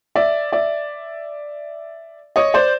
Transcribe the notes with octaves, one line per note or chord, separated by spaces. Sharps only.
D5 E5
D5 E5
C#5 D#5
C5 D5